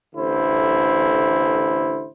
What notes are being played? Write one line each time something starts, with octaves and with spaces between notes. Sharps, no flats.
A1 D3 E4 C5